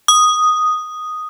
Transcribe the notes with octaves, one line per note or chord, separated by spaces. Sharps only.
D#6